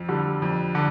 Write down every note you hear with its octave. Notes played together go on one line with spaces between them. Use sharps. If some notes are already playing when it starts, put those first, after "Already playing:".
Already playing: F2
D3 G3
F2
D3